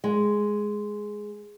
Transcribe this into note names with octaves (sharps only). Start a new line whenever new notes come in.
G#3